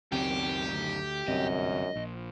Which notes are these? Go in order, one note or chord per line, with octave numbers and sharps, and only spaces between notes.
C#2 F#2 D#3 C4 G4
D2
G1 C2 F#2 C4 D#5
A#1